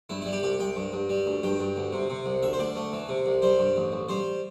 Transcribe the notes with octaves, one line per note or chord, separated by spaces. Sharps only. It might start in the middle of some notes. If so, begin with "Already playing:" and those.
G2 E4
G3 E4
G4
C2 G4
C2 G5
G2
G2
G3
D2
G2 G5
G2
D2
C3
C3
C2
D2 E5
C5
D2 D5
A3
E3
C3
C2
G3 C5
G2
A1
A1
G3 C5